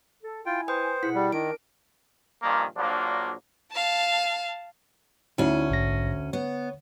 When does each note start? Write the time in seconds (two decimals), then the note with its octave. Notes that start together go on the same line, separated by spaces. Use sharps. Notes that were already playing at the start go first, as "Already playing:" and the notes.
0.23 A4
0.46 E4 F4 G5 G#5
0.68 B4 C5 G5 D#6
1.03 B2 E4 G#4 F#5 B6
1.15 G3
1.32 D#3 D4 A#4 D7
2.43 G2 A#2 D#3 F3 A#3
2.76 A#1 F3 F#3 A#3 D4
3.72 F5 A5
5.38 D2 C#4 D#4 E4
5.70 A#1 G#2 A#6
6.33 B3 C#5